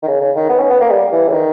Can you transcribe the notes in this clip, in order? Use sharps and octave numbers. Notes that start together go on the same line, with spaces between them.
D#3
C#3
C#3
D#3
B3
C#4
B3
A#3
G3
E3
C#3
D#3